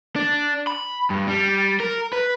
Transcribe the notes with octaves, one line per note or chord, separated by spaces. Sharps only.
D4
B5
G2
G3
A#4
B4